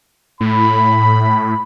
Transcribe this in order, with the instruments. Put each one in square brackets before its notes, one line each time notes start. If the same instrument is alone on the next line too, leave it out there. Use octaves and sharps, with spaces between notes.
[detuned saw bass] A2 [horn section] B5